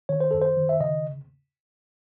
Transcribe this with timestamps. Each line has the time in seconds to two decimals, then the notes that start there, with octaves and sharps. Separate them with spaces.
0.09 D#3 C#5
0.21 C5
0.31 F#2 A4
0.42 C5
0.57 D#3
0.69 E5
0.80 C#3 D#5